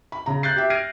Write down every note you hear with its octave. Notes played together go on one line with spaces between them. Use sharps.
B5
C#3 A#5
F#6 G6 A6 C7
G4 E5
F6 G#6 A#6 C7 D7 D#7